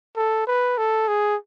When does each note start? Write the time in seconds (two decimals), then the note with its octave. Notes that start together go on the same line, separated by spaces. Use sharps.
0.17 A4
0.47 B4
0.78 A4
1.08 G#4